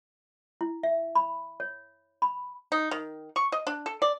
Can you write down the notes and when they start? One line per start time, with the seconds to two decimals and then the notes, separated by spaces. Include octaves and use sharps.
0.61 E4
0.83 E5
1.15 B5
1.60 C#5
2.22 B5
2.72 D#4
2.91 D#3
3.36 C#6
3.52 D#5
3.67 D4
3.86 A4
4.02 D5